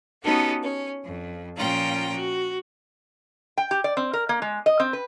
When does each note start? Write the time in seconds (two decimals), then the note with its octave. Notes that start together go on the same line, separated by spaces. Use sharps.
0.23 B3 C#4 D#4 F#4 G4 A4
0.61 C#4
1.02 F2
1.57 A#2 F3 C#4 F4 G5 A#5
2.15 F#4
3.58 G5
3.71 G4
3.84 D5
3.97 C4
4.13 A#4
4.29 A#3
4.42 G#3
4.66 D#5
4.80 C4
4.93 B4